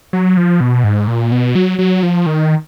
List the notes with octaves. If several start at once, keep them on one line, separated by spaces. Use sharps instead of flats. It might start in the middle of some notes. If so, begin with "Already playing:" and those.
F#3
F3
B2
G#2
A#2
B2
F#3
F#3
F3
D#3